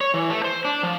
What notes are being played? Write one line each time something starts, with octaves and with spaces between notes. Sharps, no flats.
C#5
E3
A3
C5
D4
F3